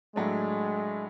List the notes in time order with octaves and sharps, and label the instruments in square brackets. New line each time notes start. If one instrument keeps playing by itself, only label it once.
[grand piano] A2 F#3 A3 D4 [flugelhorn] G#3